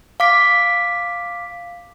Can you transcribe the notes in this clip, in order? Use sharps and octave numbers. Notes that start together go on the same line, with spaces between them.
F5 D6 B6